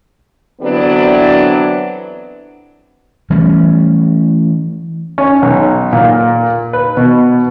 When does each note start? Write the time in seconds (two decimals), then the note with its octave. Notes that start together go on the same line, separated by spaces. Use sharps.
0.61 D3 E3 F#3 B3 C4 D4
3.30 E3 G3 A3 C#4
5.18 C#4
5.42 B1
5.93 A#2
6.73 B4
6.97 B2